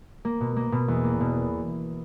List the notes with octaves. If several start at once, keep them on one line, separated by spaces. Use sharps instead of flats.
A#3
B2
A#3
B2
E2
A#3
B2